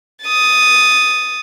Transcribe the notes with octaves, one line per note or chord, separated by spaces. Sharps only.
D#6 A6